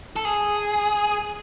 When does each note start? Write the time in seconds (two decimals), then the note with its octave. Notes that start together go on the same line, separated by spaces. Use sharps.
0.16 A4
0.25 G#4